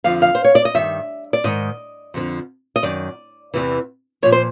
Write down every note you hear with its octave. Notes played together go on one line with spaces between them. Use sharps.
F2 D3 F3 F5
F5
C5
C#5
D5
D#5
G2 D#3 E5
D5
G#2 D#3 D#5
F2 D3 F3
D#5
F#2 D#3 D5
E2 C3 E3
A#2 F3 C#5
C5